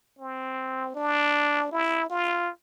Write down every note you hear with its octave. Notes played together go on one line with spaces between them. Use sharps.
C4
D4
E4
F4